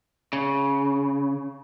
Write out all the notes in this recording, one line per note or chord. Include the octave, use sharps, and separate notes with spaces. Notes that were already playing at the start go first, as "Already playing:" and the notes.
C#3